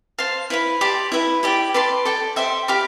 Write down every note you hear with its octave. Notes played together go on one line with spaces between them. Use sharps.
C5 F5 A5
E4 B4 F5 B5
G4 D5 A5 C6
E4 B4 E5
E4 G4 D5 G5
B4 D5 A5 C6
A4 D5 G5
G4 C5 E5 G5
G4 D5 F5 B5